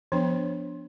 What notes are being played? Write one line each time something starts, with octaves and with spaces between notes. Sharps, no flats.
F3 B3 D4 C5